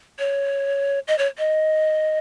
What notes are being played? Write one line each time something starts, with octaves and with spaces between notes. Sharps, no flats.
C#5
D#5
C#5
D#5